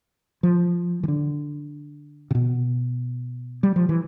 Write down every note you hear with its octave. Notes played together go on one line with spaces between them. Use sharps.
F3
E3
D3
C3
B2
G3
F3
E3